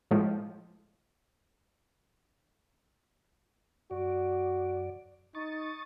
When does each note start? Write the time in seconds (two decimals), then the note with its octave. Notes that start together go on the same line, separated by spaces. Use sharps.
0.11 A2 F3 G#3
3.91 F#2 F#4 D5
5.35 D#4 C#6 D#6 A6